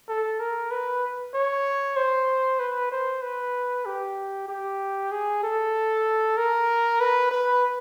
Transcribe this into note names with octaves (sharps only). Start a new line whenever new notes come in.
A4
A#4
B4
C#5
C5
B4
C5
B4
G4
G4
G#4
A4
A#4
B4
B4